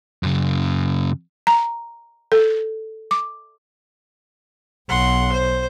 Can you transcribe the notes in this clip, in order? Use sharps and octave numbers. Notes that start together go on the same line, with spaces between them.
F#2 C#3
A#5
A4
D6
B1 F#5 C6
C5